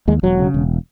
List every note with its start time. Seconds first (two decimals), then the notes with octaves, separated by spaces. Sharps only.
0.08 D#2 G#3
0.23 E1 F#3
0.39 C#3
0.54 E1